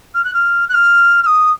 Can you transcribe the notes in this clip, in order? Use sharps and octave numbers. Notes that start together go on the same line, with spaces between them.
F6
F#6
F6
F#6
F6
F6
D#6